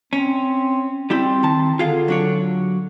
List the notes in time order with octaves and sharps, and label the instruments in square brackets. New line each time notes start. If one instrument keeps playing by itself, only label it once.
[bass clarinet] C4 [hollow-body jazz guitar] C#4
[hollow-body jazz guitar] G3 E4 G5 [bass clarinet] C4
[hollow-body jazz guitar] D#3 A5
[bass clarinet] D3 [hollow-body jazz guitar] F4 G#4 F5
[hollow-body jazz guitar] F#3 D4 C#5